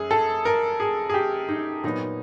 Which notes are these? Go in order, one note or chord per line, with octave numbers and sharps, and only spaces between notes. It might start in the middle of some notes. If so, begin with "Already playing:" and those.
Already playing: F#2 G#4
A4
A#4
G#4
G#4
G4
D#4
A#2 F#3 B3 D#4